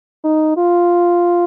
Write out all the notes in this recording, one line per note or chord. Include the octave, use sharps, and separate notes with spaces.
D#4
F4